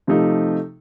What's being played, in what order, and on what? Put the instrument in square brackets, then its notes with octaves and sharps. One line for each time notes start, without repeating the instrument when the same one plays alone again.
[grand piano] C3 F3 A3 D#4